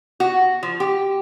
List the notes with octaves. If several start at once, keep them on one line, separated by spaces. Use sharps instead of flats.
F#4
F3
G4